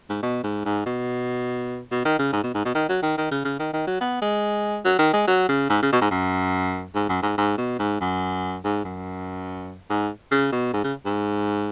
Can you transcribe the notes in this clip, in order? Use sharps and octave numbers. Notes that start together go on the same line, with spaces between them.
G#2
B2
G#2
G#2
B2
B2
D#3
C#3
G#2
B2
G#2
B2
D#3
F#3
D#3
D#3
C#3
C#3
D#3
D#3
F#3
B3
G#3
F#3
D#3
G#3
F#3
C#3
G#2
C#3
B2
G#2
F#2
G#2
F#2
G#2
G#2
B2
G#2
F#2
G#2
F#2
G#2
C#3
B2
G#2
C#3
G#2